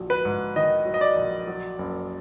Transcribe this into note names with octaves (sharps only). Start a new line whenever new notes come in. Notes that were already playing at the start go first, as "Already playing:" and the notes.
Already playing: A#1 F#3
B4
G#2
D#3 D#5
F#3
D#5
D5
A#1
F#3
F#1